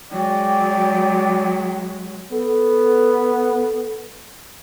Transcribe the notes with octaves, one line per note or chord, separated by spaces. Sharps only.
F#3 G#3 D5 G5
B3 A4